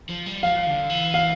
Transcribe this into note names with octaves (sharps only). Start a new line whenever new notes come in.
F3
G3
F3 F5
D3
E3
F5